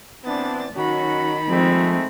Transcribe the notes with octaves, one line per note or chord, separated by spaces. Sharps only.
E3 B3 C4 D4 A6
D#3 F#3 C#4 F#4 B5
F3 G#3 A3 C4